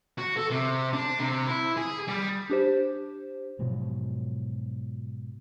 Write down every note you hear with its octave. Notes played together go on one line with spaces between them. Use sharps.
F#4
A4
C3
D4
C3
E4
G#4
G3
D4 G4 C5
G#2 B2 F3 F#3